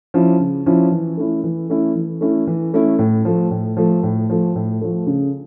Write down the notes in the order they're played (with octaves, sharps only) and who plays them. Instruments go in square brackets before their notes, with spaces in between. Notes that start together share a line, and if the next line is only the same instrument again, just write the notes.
[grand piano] F3 C#4 E4
C#3
F3 C#4 E4
E3
A3 C#4 E4
E3
A3 C#4 E4
E3
A3 C#4 E4
E3
A3 C#4 E4
A2
F3 A3
A2
F3 A3
A2
F3 A3
A2
F3 A3
C#3